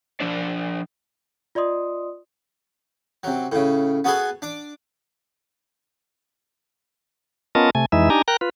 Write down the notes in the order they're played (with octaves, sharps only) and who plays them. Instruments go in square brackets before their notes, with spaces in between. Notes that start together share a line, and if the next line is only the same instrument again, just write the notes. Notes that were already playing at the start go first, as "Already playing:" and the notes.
[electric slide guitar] F3 D4 D5
[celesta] F4 D5 D#5 C6 D#6
[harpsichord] C3 F#3
A2 C#3
B3 F#4 G#4 A4 B4 G#5
D4 D6
[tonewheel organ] B3 C#4 F4 A#4 D#5 A5
C3 A3 G#5
F2 E3 G#3 D#4 E4 E5
D4 D#4 G4 G#5 A#5
A#4 G5 A#5 F#6
F4 B4